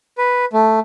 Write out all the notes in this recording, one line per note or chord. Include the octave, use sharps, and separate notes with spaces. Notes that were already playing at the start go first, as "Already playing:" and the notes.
B4
A3